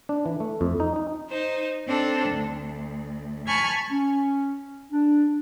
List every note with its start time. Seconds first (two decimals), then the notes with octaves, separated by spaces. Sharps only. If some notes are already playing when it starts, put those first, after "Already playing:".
0.09 D4
0.26 E3
0.40 A3
0.61 F2
0.80 D#4
0.96 D#4
1.28 D#4 C5
1.86 C4 D4 A4
2.29 D2
3.47 G#5 A5 B5 C#6 F6 G#6
3.91 C#4
4.92 D4